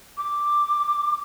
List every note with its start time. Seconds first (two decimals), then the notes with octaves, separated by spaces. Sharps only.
0.17 D6